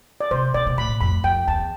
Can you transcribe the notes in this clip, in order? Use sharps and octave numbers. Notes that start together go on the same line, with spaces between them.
D5
C3 C5
B2 D5
B2
A2 B5
F2 B5
F2 G5
E2 A5